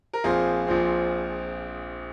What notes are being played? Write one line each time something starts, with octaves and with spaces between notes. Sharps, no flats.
A#4
A#1 A#2 F3 C4 F4 G#4
A#1 A#2 F3 C4